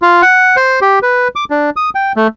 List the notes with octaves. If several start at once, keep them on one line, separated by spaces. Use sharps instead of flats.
F4
F#5
C5
G4
B4
D6
D4
D#6
G5
A3